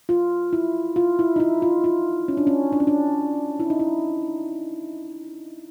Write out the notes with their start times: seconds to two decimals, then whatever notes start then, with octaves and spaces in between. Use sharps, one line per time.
0.09 F4
0.53 E4
0.96 F4
1.19 E4
1.36 D#4
1.40 E4
1.62 F4
1.84 F4
2.28 C#4
2.37 D4
2.47 C#4
2.72 D4
2.80 C#4
2.87 D4
3.60 E4
3.70 D#4
3.80 E4